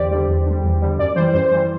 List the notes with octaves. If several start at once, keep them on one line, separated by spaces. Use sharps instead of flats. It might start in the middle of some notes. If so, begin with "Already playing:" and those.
Already playing: E2 D3 G4 C5 D5
D3 G3
E2
D3 G3
E2
D3 G3
F#2 D5
E3 G3 C5
F#2 C5
E3 G3 C5